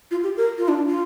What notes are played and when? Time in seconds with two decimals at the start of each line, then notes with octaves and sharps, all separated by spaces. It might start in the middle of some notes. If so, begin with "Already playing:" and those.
0.11 F4
0.24 G4
0.37 A#4
0.58 F4
0.68 D4
0.88 F4